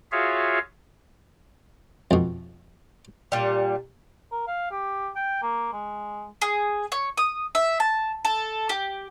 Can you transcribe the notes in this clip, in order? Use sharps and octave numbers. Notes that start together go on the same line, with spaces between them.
F4 F#4 G#4 C#5 E5 F5
F2 B2
A#2 G3
A#4
F5
G4
G5
A#3
G#3
G#4
C#5
D#6
E5
A5
A4
G4